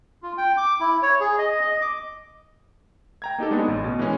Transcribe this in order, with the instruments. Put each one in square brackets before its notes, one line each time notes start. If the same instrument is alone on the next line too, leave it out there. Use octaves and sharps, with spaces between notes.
[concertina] F4
G5
D6
E4
C#5
G#4
D#5
D#5
D6
[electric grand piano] G5 A#5 G#6
A#3 D#4 G4 A4
G#3 A3 B3 D4 D#4 G#4
A1
B2
E3 G#3 A#3 C#4